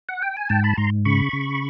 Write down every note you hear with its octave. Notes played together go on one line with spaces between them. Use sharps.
F#5
G5
G#5
G#2 G5 A5
A5 B5
G#2 A#5 C6
C#3 B5 C#6
C#3